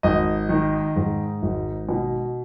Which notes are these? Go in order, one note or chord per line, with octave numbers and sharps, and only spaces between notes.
G#1 D#5
D#3
G#2
G#1
B2